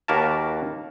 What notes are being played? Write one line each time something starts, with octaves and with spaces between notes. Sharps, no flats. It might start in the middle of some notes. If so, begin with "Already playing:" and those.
D#2 A#3 F#4 A#4 B4 A5